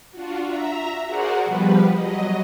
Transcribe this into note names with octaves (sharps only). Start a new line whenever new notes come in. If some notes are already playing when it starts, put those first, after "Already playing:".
D4 F4 F#4
E5 A#5
F#4 G#4 A#4 C5 D5 F#5
B2 F3 G3 B4
F#3 D#5